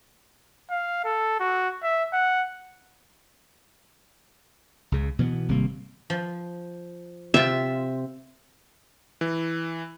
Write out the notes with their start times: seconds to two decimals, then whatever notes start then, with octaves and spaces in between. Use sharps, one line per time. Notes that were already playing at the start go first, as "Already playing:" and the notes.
0.70 F5
1.04 A4
1.40 F#4
1.83 E5
2.13 F#5
4.92 C#2 C#3
5.19 B2 E3 F#3 B3
5.48 G#1 C3 G3 A#3
6.10 F3
7.34 C3 F4 E5
9.21 E3